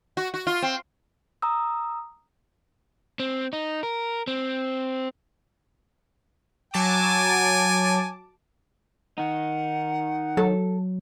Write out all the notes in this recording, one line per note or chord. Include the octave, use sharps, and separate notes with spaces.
F#4
F#4
F4
C4
A#5 D#6 E6
C4
D#4
A#4
C4
F#3 G#5 A5 D6
D#3 D#4 F#5
F#3 A4